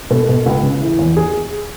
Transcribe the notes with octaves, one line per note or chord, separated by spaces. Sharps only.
B2 A4
B2
C#2
C#3
E3
E2
G#4